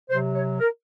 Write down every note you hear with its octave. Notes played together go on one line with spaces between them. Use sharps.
C3 F#3 C5
C#5
A#4